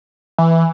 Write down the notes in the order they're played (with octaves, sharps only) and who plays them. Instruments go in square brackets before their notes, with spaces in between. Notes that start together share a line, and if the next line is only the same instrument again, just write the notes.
[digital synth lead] E3